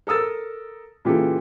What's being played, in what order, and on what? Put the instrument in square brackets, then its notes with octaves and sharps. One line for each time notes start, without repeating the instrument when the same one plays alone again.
[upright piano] A4 A#4 D#6 E6 A6
A#2 C#3 E3 F4 G4 A4